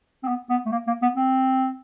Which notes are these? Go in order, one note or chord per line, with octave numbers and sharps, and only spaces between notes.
C4
B3
B3
A3
A#3
A#3
B3
C4